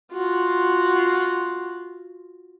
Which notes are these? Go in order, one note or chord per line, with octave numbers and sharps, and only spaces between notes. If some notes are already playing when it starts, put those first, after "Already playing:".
F4 F#4